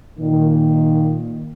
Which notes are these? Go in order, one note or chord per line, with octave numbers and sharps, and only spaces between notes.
A#2 D#3